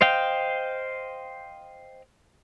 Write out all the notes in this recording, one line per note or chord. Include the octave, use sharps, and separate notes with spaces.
C5 D#5 F5 G5